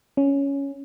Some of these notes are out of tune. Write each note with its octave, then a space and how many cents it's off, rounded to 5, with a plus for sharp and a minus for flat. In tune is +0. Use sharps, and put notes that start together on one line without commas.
C#4 +5